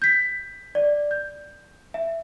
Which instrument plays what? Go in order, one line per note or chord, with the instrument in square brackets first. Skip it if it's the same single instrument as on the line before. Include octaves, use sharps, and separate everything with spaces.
[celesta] G6 B6
D5
G6
E5